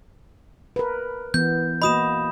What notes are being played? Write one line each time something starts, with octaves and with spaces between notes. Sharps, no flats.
A#4 B4
E3 B3 G6
A#3 F#4 D#5 B5 D#6 E7